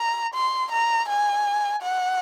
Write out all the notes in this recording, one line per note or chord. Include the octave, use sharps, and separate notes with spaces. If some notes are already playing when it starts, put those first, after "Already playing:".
Already playing: A#5
C6
A#5
G#5
F#5